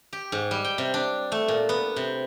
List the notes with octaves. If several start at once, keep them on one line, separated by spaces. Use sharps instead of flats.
G4
G#2
G3
G5
C3
D4
A3
A#2
B3
C3